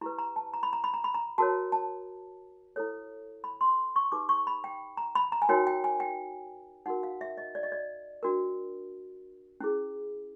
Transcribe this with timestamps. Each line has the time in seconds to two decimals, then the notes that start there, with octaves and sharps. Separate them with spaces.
0.01 E4 G4 B4 A#5
0.18 A#5
0.36 A5
0.54 A#5
0.63 B5
0.73 A#5
0.84 B5
0.94 A#5
1.04 B5
1.14 A#5
1.38 F#4 A#4 C#5 A5
1.72 A5
2.76 E4 A4 C#5
3.44 B5
3.61 C6
3.96 C#6
4.12 D#4 G4 B4 D6
4.29 C#6
4.47 B5
4.64 G5
4.97 A#5
5.15 B5
5.32 A#5
5.42 G#5
5.49 D#4 F#4 A#4 C#5 G5
5.67 G5
5.84 G#5
6.00 G5
6.86 D#4 F#4 A#4 F#5
7.03 F5
7.21 E5
7.38 D#5
7.55 D5
7.63 D#5
7.72 D5
8.23 D4 F#4 A#4
9.60 C#4 E4 G#4